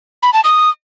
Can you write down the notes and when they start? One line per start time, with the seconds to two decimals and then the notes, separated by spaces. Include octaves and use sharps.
0.23 B5
0.33 A5
0.44 D#6